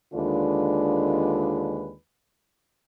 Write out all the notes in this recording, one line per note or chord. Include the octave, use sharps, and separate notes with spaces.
D#2 D3 G#3 D4 F4 B4